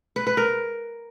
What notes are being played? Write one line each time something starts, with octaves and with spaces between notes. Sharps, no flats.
B4
B4
A#4